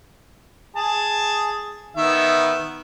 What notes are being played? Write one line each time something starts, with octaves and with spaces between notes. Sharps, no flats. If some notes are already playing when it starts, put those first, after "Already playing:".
G#4 A5
D#3 B3 E5